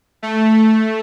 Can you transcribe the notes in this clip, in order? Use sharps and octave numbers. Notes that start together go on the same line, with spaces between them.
A3